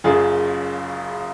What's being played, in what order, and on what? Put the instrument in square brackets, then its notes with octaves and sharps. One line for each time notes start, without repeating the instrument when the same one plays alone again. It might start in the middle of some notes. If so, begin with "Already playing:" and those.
[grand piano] F#1 F#2 C#3 F4 G#4